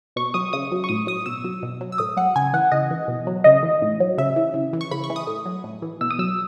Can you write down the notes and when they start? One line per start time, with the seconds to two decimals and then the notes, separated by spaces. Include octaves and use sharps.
0.16 B2 C#6
0.34 F#3 D#6
0.53 C#3 D#6
0.72 F#3
0.84 C#6
0.89 A2 D#6
1.07 F#3 D#6
1.26 B2 E6
1.44 F#3
1.63 B2
1.81 F#3
1.92 E6
1.98 A2 D#6
2.17 F#3 F#5
2.36 C#3 G#5
2.53 E3 F#5
2.72 C#3 D#5
2.91 E3
3.08 B2
3.27 F#3
3.44 C#3 D#5
3.63 E3
3.82 A2
4.00 F#3
4.18 C#3 E5
4.36 E3
4.54 C#3
4.73 E3
4.81 C#6
4.91 C#3 B5
5.04 C#6
5.10 E3
5.16 D#6
5.27 A2
5.46 F#3
5.64 A2
5.82 E3
6.01 B2 E6
6.11 D#6
6.19 F#3 E6